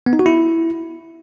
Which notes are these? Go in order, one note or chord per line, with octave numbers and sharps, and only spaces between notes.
B3
D#4
F#4
E4